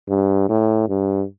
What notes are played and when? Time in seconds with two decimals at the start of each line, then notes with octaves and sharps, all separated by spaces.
0.09 G2
0.49 A2
0.89 G2